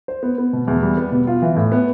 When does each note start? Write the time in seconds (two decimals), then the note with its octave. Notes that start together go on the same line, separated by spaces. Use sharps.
0.08 C5
0.23 B3
0.38 B3
0.53 B2
0.67 E2
0.83 G3
0.97 B3
1.12 B2
1.27 F4
1.42 E3
1.56 A2
1.72 B3